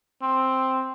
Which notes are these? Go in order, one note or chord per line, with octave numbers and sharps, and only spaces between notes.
C4